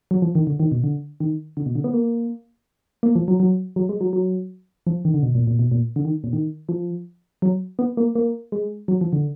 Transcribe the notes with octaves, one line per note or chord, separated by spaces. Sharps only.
F#3
F3
D#3
D3
D#3
B2
D3
D#3
D3
B2
D3
B3
A#3
A#3
F3
F#3
F#3
F#3
G#3
F#3
F#3
F3
D#3
D3
B2
A#2
A#2
B2
A#2
D3
D#3
A#2
D#3
F3
F#3
B3
A#3
A#3
G#3
F#3
F3
D3